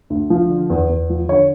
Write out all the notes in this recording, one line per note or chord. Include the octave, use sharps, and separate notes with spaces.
D2
F3
D3
E2
E2
F3
D3 C#5